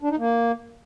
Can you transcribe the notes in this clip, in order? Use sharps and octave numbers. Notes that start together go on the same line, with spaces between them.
D4
D#4
A#3